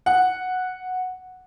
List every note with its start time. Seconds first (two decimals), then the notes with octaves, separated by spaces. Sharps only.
0.06 F#5